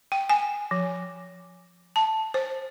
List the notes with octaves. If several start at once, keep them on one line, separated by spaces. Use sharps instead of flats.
G5
G#5
F3
A5
C5